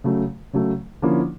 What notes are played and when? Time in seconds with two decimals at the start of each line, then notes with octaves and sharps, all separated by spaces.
0.04 C#3 F#3 A3
0.53 C#3 F#3 A3
1.02 D3 F3 A#3 C#4 E4